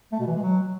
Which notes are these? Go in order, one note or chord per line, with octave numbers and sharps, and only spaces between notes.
A3
B2
E3
G#3
F#3